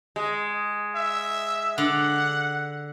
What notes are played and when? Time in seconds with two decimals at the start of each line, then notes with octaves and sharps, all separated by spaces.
0.16 G#3
0.95 E5
1.78 D3 F#5